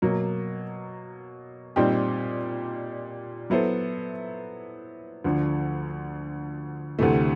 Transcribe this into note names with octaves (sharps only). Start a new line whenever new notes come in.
B2 F#3 A#3
A#2 G3 C4 D#4 G4
F#3 B3 E4 A4 C5
D2 D3 F3
D2 C3 E3 A3